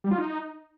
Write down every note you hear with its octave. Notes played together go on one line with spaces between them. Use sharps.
G3
F4
D#4